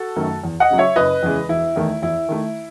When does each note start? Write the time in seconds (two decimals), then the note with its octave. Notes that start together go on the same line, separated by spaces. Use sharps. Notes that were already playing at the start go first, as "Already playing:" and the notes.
Already playing: F#4 A4
0.16 F#2 D#3 F#3 A3
0.43 E2
0.60 D#5 F#5
0.70 C#3 F#3
0.78 C#5 E5
0.96 F#1 B4 D#5
1.23 E2 C#3 E3 G#3
1.49 E1 E4
1.76 E2 D#3 A3
2.02 E2 E4
2.29 D#3 A3